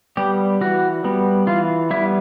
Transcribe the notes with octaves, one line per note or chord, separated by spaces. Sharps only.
G3 B3 G4
E3 F#4
G3 B3
E3 F4
G3 B3 E4